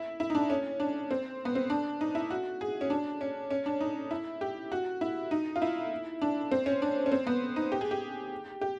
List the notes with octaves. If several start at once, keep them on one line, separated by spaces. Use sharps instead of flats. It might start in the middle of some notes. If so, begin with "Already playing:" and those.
Already playing: E4
E4
D#4
D4
C#4
D4
C4
B3
C4
D4
D#4
E4
F#4
G#4
C#4
D4
C#4
C#4
D4
D#4
E4
G4
F#4
E4
D#4
F4
E4
D4
C4
C#4
D4
C#4
C4
B3
D#4
G4
G#4
G4
G4